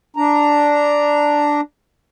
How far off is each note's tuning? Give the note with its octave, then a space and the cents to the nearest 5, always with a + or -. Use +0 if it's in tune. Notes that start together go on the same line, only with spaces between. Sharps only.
D4 +0 A#5 +0